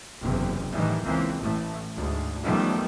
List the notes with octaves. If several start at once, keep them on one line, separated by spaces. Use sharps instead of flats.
F#1 E2 C3
A2 D#3 E3 G3
C#2 E3 A#3 C4
A1 A2 A3
D2 G#2
F#2 D#3 F3 G3 A3 B3